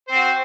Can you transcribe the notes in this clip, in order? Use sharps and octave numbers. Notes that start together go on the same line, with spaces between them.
C4 F#4 C5